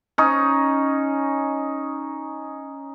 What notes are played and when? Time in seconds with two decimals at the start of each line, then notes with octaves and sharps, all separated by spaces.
0.18 C#4 D#4